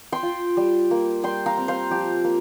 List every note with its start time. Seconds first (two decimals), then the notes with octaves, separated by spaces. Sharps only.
0.12 G5 C6
0.23 F4
0.57 G3
0.91 A#3
1.23 G3 G5 C6
1.46 F5 A#5
1.57 C4
1.68 C5 F5
1.90 F3 G4
2.24 A#3